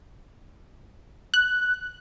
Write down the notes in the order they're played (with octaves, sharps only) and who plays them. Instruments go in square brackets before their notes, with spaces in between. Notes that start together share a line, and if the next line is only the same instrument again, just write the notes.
[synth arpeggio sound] F#6